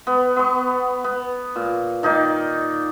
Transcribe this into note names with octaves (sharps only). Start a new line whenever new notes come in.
B3
B3 C#6
B3
A#2
D#3 D#4 A#4 D5